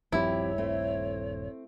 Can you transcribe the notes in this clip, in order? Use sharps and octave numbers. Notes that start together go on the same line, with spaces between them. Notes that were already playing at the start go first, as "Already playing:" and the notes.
D#1 G2 F3 C4 E4 G4 C#5
A3 C4